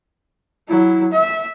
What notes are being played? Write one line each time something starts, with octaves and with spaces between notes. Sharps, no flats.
F#3 E4
E5